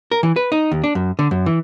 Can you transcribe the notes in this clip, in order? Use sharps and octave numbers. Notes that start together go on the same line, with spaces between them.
A#4
E3
B4
D#4
D#2
D4
F#2
D3
F#2
E3